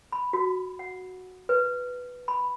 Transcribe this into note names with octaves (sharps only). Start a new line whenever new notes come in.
B5
F#4
F#5
B4
B5